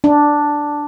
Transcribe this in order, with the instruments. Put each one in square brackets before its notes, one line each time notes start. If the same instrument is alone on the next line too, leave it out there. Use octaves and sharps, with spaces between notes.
[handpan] D4